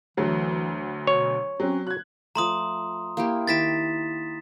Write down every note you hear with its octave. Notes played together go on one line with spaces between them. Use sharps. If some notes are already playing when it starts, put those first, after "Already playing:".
D2 E3 F#3 A3
B2 C#5
F#3 C4 C#4
F#4 F#6 G#6
F3 A3 A#5 C6 D#6
A#3 E4 G4
D#3 E4 D6 A6 B6 E7